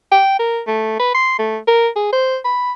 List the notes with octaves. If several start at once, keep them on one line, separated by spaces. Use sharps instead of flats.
G5
A#4
A3
B4
C6
A3
A#4
G#4
C5
B5